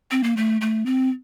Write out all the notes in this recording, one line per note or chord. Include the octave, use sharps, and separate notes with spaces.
C4
A#3
A3
A3
C4